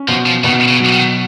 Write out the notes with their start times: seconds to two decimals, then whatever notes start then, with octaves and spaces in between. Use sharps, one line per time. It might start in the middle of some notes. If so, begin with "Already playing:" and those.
Already playing: C#4
0.08 B2 F3
0.26 F3
0.44 B2 D#3
0.68 C#3
0.80 F#3
0.93 D#3